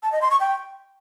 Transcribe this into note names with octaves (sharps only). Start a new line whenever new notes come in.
A5
D#5
C6
C#6
G5